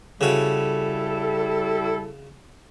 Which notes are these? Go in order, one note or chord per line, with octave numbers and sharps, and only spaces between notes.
C#3 G3 E4 F#4 A4